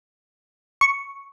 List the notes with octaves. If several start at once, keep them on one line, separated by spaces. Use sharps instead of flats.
C#6